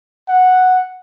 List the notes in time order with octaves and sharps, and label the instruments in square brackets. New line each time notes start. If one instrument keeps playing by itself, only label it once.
[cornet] F#5